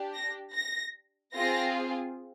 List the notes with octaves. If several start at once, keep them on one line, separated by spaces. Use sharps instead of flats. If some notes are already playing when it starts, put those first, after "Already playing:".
Already playing: D4 G4
A#6
A#6
C4 F4 G#4 A#6